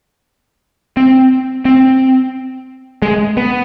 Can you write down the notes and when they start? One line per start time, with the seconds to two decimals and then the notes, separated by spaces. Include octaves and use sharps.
0.97 C4
1.65 C4
3.02 G#3
3.37 B3